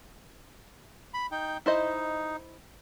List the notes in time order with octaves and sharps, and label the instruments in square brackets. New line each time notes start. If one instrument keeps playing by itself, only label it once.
[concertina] B5
D#4 G5
[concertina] D#4 [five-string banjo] E4 C5 D#5